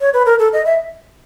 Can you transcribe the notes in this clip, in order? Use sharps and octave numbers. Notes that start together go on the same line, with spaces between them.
C#5
B4
A#4
A4
D#5
E5